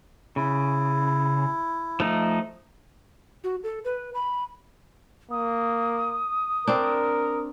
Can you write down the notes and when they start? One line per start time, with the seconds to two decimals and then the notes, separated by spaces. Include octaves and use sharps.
0.36 C#3 E4
2.00 F3 A3 D#4
3.44 F#4
3.63 A4
3.85 B4
4.14 B5
5.31 A#3 D#6
6.67 C4 D4 A#4